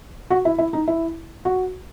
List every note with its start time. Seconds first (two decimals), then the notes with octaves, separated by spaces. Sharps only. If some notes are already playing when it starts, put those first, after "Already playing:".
0.30 F#4
0.45 E4
0.58 E4
0.73 D#4
0.88 E4
1.45 F#4